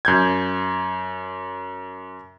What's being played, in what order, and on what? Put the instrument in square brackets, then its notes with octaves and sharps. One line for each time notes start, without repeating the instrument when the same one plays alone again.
[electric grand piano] F#2 G6 G#6